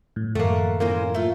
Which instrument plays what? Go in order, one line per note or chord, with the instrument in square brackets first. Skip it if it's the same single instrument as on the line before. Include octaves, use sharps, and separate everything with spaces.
[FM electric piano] A2
[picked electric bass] F#2 D#3 F3 [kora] A3 A#3 [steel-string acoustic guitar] F#5
[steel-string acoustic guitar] E3 C#4 C5 [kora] A#3
[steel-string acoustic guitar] A3 F4